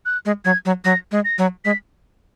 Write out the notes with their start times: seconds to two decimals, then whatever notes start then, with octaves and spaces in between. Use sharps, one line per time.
0.06 F#6
0.25 G#3
0.45 F#3 G#6
0.65 F#3
0.85 F#3 A#6
1.12 G#3
1.25 A#6
1.38 F#3
1.65 G#3 B6